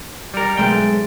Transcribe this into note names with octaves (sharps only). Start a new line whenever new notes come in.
G3 A#4
B1 G#3 A3 G5